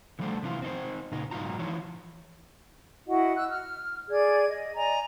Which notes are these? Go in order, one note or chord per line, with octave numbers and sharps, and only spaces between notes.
D3 F3 G3 A3 A4 C5
C3 E3 F4
C4 D#4 C5
A#2 C#3 D#4
G#2 F#3 D#4 F4 A#5
E3 F3 E4 F4 C#5
E4 F#4 D#5 F#5
E6 F#6
F6
G#4 D5 G#6
D#5
D5 D#5 G#5 A#5